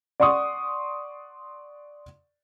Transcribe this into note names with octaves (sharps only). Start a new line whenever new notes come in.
D5 F#5 C6 C#6 D#6